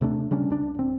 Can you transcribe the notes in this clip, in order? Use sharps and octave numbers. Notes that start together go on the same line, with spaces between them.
D#2 C3 A3 D4
C#3 G3 C#4 D4
C#2 D4
D1 C4